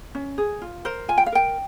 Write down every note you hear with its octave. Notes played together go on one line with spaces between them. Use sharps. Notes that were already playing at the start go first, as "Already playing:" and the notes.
C#4
G#4
F4
A#4 C5
F4 G#5
G5
F5
A#4 G5